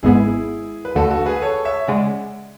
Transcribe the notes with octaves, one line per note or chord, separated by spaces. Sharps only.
G#1 G#2 G#3 B3 E4 G#4
B4
D2 D3 A3 F#4 A4
F#4 A4
G#4 B4
A4 C#5
C#5 E5
C#3 G#3 D5 F#5